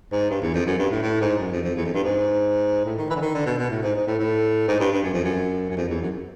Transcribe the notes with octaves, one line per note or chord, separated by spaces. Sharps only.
G#2
G2
E2
F2
F#2
G2
A2
A2
G#2
F#2
F2
F2
E2
F2
G2
G#2
A2
D#3
E3
D3
D#3
D3
B2
B2
A2
G#2
G#2
A2
A2
G#2
G2
G2
F#2
F2
F#2
F#2
F2
E2
F#2